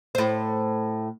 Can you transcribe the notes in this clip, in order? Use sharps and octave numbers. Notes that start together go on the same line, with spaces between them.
A2 C5